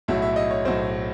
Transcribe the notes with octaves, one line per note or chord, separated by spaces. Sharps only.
B1 A2 F#3 E5
E5
D#5
C#5
B1 A2 F#3 C5